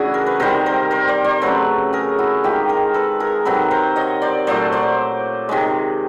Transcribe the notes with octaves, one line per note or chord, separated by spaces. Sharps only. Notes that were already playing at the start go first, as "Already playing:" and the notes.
Already playing: C#3 E3 A3 D4 E4 F#4 G#4
A#4
B4
C3 D#3 G3 A#4 C5
A#4 C5
A#4 C5
C5 D5
C5 D5
C#3 F#3 A3 B4 C#5
G#4 A#4
E4 F#4
D#3 G#3 F4 G4
G#4 A#4
A4 B4
G#4 A#4
C3 D#3 F#3 A4 B4
A#4 C5
C#5 D#5
C5 D5
A#2 F#3 A3 C5 D5
C5 D5
C3 D#3 G#3